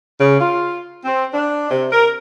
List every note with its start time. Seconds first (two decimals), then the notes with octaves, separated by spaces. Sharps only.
0.20 C#3
0.40 F4
1.04 C4
1.34 D4
1.70 C3
1.92 A#4